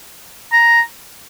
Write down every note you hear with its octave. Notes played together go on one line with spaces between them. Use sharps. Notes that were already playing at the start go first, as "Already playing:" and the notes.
A#5